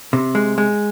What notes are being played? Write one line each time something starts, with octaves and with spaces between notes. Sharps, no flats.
C3
G#3
G#3